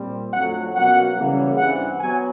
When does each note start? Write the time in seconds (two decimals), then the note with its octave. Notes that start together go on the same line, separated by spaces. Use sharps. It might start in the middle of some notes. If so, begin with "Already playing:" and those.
Already playing: A#2 G3 C4
0.34 F2 D3 F#3 A3 F#5
0.76 B2 F#3 A#3 C#4 F#5
1.17 C#3 E3 G3 A#3
1.58 G2 E3 G3 C4 F#5
2.00 F#3 B3 G#5